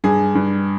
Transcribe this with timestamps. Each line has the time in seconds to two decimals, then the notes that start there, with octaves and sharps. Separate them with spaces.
0.04 G2 G#4
0.35 G2